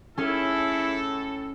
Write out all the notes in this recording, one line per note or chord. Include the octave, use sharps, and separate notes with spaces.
A2 C#4 E4 G#4 A4